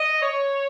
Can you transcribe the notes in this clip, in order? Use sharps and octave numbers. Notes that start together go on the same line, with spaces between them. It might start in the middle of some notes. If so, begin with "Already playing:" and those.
Already playing: D#5
C#5